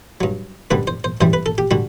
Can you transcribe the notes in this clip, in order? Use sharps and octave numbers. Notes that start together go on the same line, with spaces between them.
G2 F#3
F#2 D3 G3 B4
C5
C5
F#2 E3 G3 C5
B4
A4
G4
D3 G3 F#4